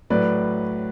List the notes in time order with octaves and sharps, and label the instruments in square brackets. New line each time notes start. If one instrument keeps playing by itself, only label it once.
[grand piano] A2 F#3 B4 D5